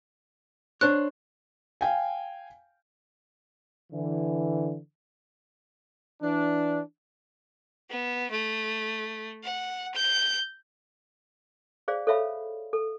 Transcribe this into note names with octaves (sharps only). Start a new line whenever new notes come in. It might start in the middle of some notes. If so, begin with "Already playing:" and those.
D4 C5 C#5 F#6
F5 G5 G#5
D3 E3
E3 D4
B3
A3
F#5
G6
G#4 C5 D5 F5
A4 C5 C#5 E5 F5 B5
A4